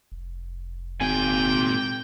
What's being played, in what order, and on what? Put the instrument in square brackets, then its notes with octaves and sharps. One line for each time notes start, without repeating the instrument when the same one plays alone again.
[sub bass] F1
[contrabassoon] G#1 [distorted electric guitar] A#2 G#5 [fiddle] G5